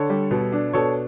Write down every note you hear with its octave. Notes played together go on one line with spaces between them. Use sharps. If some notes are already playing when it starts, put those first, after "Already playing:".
Already playing: D3 A4 C#5
G3
B2
D4
B2 A4 C#5